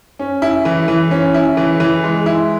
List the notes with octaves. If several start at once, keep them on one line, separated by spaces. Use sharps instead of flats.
C#4
E4
E3
E3
C#4
E4
E3
E3
G#3
E4